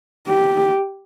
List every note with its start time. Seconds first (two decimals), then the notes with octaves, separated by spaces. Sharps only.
0.28 G4